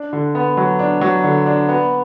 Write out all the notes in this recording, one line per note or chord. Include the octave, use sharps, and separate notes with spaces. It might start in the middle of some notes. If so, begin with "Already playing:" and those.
Already playing: D4
D3
B3
F#3
D4
F#3
D3
D4
B3